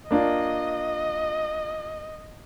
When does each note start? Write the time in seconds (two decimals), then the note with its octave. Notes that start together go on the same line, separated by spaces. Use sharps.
0.11 A#3 D4 F4 D#5